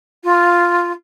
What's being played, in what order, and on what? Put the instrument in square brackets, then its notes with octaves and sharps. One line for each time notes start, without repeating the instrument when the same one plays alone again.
[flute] F4